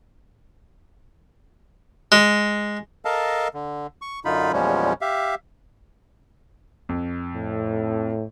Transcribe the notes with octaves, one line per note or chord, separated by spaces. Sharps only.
G#3
A4 A#4 D#5 F5 A5
D3
C#6
F#2 D3 D#4 F4 B5
E2 A#2 F3 G3 G#3 C#4
G4 E5 F5
F2
A2